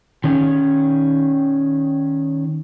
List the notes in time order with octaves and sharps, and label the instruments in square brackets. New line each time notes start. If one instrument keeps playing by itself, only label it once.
[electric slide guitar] D#3 C#4